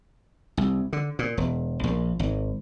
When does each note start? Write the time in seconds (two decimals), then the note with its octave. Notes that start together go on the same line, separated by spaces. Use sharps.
0.57 C2
0.93 D3
1.19 A#2
1.37 E1
1.84 A#1
2.19 G#1